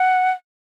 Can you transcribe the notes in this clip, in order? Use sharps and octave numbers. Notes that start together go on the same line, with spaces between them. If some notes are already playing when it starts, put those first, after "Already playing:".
Already playing: F#5